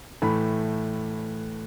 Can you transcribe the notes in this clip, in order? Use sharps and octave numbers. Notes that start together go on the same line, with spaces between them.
A2 E3 A3 B5